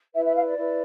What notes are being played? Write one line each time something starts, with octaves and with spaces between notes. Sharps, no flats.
E4 B4 E5
E5
F5
D5
E4 B4